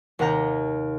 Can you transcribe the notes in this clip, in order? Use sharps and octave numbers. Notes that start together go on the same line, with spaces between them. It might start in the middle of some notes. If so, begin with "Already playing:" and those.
D#2 C3 F#5 A#5 G6